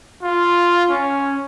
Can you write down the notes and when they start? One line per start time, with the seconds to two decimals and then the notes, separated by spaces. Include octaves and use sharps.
0.23 F4
0.90 C#4